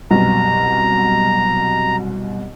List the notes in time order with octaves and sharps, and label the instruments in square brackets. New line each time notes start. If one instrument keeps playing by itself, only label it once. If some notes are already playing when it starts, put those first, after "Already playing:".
[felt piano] C2 F#2 B2 [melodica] A#5